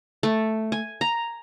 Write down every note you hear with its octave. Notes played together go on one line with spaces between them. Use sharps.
A3
G#5
A#5